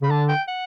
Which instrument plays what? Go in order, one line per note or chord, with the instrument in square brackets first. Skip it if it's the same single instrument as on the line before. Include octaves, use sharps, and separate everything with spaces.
[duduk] C#3 [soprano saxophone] B5
[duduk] D3 [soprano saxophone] A5
[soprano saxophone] G5
F#5